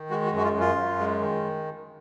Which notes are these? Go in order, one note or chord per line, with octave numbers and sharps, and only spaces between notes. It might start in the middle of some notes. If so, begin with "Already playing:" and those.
Already playing: D#3
G#3 F#4
F#4
F#2
F#4
F4
F#2
F4
F#2
G#3
D#3